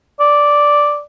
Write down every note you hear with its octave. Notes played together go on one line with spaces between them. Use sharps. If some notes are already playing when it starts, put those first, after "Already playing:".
D5